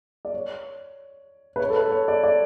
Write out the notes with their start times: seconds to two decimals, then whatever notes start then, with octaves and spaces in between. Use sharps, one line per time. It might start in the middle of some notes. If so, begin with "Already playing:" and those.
0.25 D5
0.34 C#5
1.56 B4
1.60 C#5
1.70 A4
1.76 B4
1.91 C#5
2.08 D5
2.24 D5